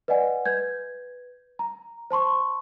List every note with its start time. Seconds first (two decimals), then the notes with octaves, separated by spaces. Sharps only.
0.08 B4 D5 D#5 F#5 G#5
0.46 B4 G6 G#6
1.59 A#5
2.11 C5 A5 C6 C#6